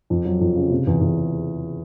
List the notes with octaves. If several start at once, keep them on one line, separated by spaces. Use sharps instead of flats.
F2
F#3
F2
C#3
C3
E2
E2